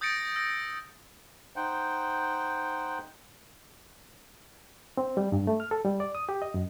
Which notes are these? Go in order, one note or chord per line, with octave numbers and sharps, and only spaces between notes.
D#6 G6 A6 A#6 C#7 D7
E6 A#6
D#4 C5 F#5 G5
C4
G3
G2
A3
F6
A4
G3
D5
D#6
G4
D#5
F#2